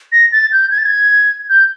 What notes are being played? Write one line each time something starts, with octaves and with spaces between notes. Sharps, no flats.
A#6
A6
G6
G#6
A6
G#6
G6